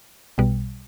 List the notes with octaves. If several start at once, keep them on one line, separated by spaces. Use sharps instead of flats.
B1 B2 G3